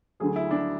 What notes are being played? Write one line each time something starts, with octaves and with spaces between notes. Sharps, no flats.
D2 D3 F#3 A3 G#4
E4
D4